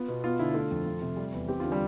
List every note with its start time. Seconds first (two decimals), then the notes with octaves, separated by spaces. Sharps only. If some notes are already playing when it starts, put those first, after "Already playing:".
Already playing: B3 F4
0.08 B2
0.24 B3 F4
0.39 D3 E4
0.54 A3 F4
0.71 F2
0.86 A3
1.02 C3
1.17 G3
1.33 E2
1.49 C4 G4
1.60 D3 F4
1.71 G3 G4